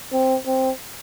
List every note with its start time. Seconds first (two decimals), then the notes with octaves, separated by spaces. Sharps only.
0.12 C4
0.46 C4